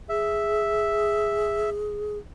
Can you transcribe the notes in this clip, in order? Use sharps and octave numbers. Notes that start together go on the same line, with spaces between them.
G#4 E5